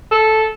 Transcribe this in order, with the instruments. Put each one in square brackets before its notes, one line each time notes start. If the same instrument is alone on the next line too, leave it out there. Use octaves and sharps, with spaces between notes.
[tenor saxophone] A4